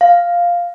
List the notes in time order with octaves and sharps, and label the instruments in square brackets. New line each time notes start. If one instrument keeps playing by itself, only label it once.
[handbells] F5